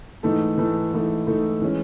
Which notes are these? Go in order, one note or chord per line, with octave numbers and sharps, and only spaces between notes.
G#2 E3 A3 D#4 A4
G#2 E3 A3 D#4 A4
G#2 E3 A3 D#4 A4
G#2 E3 A3 D#4 A4
E3 G#3 C#4